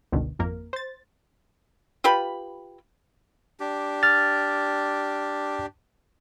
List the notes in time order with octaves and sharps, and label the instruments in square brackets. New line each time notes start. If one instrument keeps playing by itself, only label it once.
[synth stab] G1 C#2 B2 D3 D#3
G#1 F2 A#3 A#4
C5 A6
[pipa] F4 G4 B4 B5
[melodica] D4 G4
[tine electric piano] F6 A6